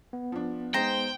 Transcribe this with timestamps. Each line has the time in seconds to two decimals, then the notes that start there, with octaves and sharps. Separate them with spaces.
0.13 B3
0.32 F3 D4
0.74 G#3 D#4 C5 G5 A#5